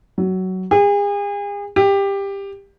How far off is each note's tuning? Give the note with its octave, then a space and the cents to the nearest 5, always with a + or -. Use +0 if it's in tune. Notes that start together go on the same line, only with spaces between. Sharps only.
F#3 +15
G#4 -40
G4 +15